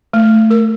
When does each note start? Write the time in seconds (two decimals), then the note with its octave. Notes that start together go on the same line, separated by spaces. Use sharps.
0.13 A3
0.51 A#4